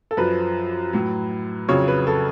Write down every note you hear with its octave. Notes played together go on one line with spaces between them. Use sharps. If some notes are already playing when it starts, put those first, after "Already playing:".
A4
F#2 F3 B4
A2 F#3
F2 C#3 F#3 C#5
B4
A4